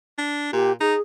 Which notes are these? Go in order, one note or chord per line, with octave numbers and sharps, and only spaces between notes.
D4
A#2 G4
D#4 G#4